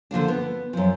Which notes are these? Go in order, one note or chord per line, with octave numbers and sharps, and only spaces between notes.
D3 F3 A#3 D4
B3
F#2 F3